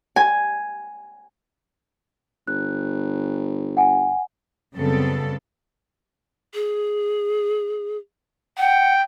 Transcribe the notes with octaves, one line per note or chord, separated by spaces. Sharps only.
G#5
G1 F#6
F#5 G#5
F#2 C#3 G3 B3 C4 A4
G#4
F#5 G5